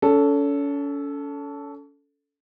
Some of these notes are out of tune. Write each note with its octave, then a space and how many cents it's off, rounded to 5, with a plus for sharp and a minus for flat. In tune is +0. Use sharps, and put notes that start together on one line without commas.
C#4 +35 A4 +0